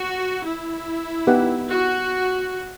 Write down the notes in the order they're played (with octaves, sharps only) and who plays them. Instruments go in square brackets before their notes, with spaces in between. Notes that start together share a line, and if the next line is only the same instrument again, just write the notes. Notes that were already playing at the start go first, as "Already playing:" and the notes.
Already playing: [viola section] F#4
E4
[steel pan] B3 D#4 G4 B4 F#5
[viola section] F#4